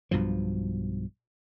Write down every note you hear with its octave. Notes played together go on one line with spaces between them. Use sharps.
B1 G2 B2 F3